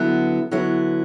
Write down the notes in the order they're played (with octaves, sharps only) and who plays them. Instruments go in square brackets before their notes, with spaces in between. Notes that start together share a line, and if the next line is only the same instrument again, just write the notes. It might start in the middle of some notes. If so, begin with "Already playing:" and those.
Already playing: [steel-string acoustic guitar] D3 F#3 B3 E4
D3 F#3 B3 E4